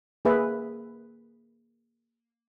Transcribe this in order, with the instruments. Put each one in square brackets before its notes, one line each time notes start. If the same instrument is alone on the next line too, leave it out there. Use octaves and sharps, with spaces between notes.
[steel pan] A#3 G#4 B4 E5